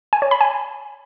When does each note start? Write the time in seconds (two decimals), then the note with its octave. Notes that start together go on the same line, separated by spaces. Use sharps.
0.13 G#5
0.22 C#5
0.31 B5
0.41 G#5